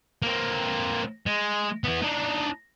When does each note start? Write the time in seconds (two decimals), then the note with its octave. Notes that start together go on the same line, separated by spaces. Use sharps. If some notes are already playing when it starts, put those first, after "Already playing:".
0.22 A#3 C4
1.26 G#3
1.84 E3 B3
2.02 D4 D#4